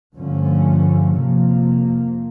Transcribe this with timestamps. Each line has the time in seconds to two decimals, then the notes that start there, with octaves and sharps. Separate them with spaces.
0.15 G2 D3 F3 A3 C#4
1.16 F2 C3 F3 A#3